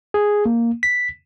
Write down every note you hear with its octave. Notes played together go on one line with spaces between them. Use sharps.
G#4
A#3
B6